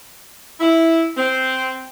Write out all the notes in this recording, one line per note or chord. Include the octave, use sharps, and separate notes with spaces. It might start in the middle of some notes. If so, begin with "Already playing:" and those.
E4
C4